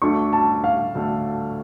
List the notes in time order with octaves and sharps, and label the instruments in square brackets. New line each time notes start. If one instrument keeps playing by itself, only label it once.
[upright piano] D2 D3 A3 D4 [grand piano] C#6
[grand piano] A5
F5
[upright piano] D2 D3 A3 D4